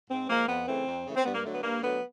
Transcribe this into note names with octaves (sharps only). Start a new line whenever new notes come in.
G#2 C4
F3 G#3 A#3
F2 B3
C#3 E3 A3 C4
F2
C#3 E3 A3
C4
G2 B3
A#3
D3 F#3 A3
B3
G2 A#3
D3 F#3 A3 B3